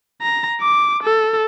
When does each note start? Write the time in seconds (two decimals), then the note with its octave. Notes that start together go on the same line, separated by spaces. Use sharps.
0.22 A#5
0.61 D6
1.03 A4